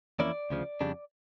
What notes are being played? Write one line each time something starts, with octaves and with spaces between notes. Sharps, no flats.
F2 E3 A#3 C#4 E4 D5
D2 C#3 F3
F2 C#3 G3 D4